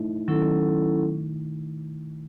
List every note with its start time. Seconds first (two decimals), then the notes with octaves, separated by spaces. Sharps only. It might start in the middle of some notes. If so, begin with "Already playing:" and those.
Already playing: A3 D#4 E4
0.28 D#3 F#3 C#4 E4 A4